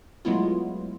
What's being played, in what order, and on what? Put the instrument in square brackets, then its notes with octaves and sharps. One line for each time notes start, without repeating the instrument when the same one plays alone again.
[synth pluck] F#3 G#3 A3 B3 E4 F4